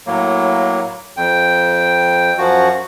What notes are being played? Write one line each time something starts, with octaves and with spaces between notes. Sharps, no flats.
A2 F#3 A#3
F2 G5
F#2 F3 F#4